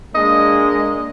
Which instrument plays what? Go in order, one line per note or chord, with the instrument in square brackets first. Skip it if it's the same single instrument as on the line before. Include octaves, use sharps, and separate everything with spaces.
[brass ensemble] G#3 A#3 D4 [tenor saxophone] D#5